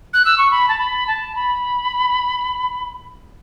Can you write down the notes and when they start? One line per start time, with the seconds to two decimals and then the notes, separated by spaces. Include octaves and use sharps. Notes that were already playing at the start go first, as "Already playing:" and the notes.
0.13 F#6
0.25 E6
0.37 C#6
0.50 B5
0.68 A5
0.78 B5
1.07 A5
1.35 B5